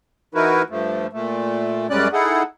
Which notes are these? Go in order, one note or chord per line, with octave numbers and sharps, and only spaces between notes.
E3 D#4 E4 F#4 A#4 B4
G2 F3 A3
A#2 A3
F#2 G3 G#3 C#4 D5 F#6
D#4 E4 G#4 A4 F#5